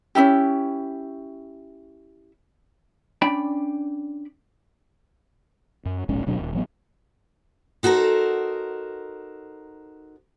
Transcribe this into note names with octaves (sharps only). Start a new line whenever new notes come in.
C#4 D#4 E4 G4
C#4 D4 D5 G5 B5
F#2
E1 A#1 G#2 C#4
D1 B2 F#3 D4
D#1
A1 F#3 B3
D#4 F#4 A4 A#4 C5